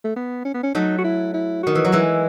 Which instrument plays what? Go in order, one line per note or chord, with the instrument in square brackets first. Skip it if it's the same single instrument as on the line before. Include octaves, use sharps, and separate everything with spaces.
[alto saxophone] A3
B3
C#4
B3
C#4
[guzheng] F#3 A3 [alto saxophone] D#4
[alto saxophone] F#4
E4
E4
[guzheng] D#3 [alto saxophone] F#4
[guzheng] E3
[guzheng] F#3 [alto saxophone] F#4
[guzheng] E3 G#3 [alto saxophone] E4